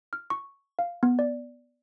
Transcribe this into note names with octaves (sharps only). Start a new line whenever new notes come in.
F6
C#6
F5
B3
D5